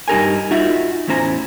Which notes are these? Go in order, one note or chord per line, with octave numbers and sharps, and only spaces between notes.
G2 D#4 G4 A#4 B4 G#5
D#4 F4 F#4 E5
E2 A2 C#4 C5 A#5